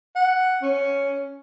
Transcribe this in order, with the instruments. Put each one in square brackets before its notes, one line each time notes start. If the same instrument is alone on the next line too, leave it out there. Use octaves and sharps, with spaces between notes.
[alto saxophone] F#5
C#4